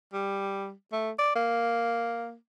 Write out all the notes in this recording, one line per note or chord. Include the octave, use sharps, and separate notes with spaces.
G3
A3
D5
A#3